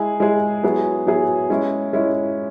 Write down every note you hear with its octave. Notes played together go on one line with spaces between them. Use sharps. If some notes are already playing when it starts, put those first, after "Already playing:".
Already playing: G#3 E4 G#4
G#3 E4 G#4
F#3 B3 E4 G#4
F#3 B3 E4 G#4
G#3 C#4 E4
G#3 C#4 E4